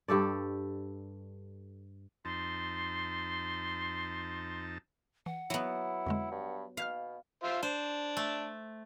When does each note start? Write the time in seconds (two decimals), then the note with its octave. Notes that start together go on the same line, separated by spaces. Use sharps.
0.08 G2 G4 A4 D5
2.25 F2 D#4 A5 C6
5.26 E3 F#5
5.50 F#3 B3 E4
6.06 F2 D3 G#3
6.31 G2
6.77 B2 F5 F6 G6 B6
7.44 F4 C5 E5
7.63 D4 C5
8.17 A3